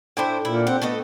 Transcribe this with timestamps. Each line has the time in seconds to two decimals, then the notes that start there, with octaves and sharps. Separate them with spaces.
0.17 A2 D4 E4 C5 G5
0.45 A#2 E4
0.67 C4 G4 F#5
0.82 A3 B3 A4 D#5